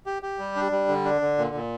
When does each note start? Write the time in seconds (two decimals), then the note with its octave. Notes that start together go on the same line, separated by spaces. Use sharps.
0.06 G4
0.22 G4
0.39 G3
0.56 D4
0.72 G3
0.88 D3
1.05 D4
1.21 D3
1.38 A#2
1.55 A#2